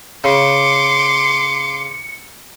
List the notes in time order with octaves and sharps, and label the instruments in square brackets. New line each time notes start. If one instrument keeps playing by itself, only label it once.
[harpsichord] C#3 [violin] C6 D6 [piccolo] C#7